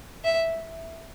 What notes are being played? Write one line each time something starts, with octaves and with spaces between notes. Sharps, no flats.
E5